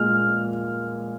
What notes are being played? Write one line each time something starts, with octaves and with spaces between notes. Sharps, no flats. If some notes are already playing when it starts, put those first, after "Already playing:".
Already playing: A#2 G#3 F6